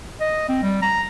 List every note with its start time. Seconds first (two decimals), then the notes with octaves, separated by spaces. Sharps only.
0.20 D#5
0.49 C4
0.63 G3
0.82 A#5